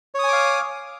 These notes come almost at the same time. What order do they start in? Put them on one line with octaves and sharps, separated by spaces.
C#5 D#6 G#5 D6 F5